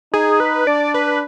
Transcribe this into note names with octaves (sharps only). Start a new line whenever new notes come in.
D#4 G#4
B4
D4 D5
B4